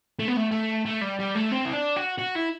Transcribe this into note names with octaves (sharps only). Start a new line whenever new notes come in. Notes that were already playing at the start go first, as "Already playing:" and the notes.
A3
B3
A3
A3
A3
G3
G3
A3
C4
E4
D4
F#4
F#4
E4